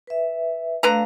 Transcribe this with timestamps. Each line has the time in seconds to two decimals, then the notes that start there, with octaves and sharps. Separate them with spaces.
0.07 B4 E5
0.83 D3 A3 B4 F5 A#5